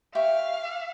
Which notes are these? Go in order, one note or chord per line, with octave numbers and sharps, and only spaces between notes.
G4 E5 F5 C#6